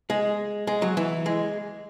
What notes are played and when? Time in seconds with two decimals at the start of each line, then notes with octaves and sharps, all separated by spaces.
0.10 G#3
0.67 G#3
0.82 F#3
0.97 E3
1.26 G#3